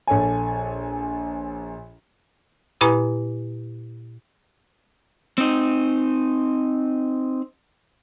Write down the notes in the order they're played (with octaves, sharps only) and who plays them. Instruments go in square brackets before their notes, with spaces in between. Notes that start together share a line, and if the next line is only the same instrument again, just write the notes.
[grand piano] A#1 A4 C#5 G#5
[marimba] A#2 E4 B4 G#5 A#5 D#6
[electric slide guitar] C4 D#4